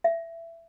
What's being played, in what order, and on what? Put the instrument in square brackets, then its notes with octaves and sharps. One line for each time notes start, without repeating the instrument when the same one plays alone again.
[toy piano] E5